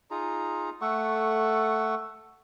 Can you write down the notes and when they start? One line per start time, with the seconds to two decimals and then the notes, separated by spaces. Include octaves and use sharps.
0.11 D#4 F4 G#4 A#5
0.81 A3 A4 F#5 C#6